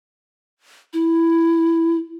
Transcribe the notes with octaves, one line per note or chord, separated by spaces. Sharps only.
E4